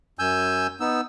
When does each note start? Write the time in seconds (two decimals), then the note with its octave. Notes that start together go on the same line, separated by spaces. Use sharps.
0.19 F#2 G#5 E6 G6
0.80 B3 D#4 E6